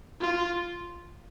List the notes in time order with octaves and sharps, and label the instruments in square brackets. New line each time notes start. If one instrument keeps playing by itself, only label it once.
[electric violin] F4